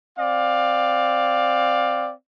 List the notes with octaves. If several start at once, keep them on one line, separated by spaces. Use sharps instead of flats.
C4 D5 F5